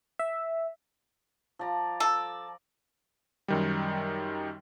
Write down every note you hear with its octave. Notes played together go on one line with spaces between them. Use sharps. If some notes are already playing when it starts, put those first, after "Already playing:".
E5
F3 D5 A#5
A4 D5
F#2 D#3 G3